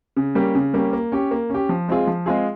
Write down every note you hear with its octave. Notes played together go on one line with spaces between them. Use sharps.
C#3
G3 A#3 C#4 G4
C#3
G3 A#3 C#4 G4
A#3
C#4 G4
A#3
C#4 G4
F3
G#3 C4 F4 G#4
F3
G#3 C4 F4 G#4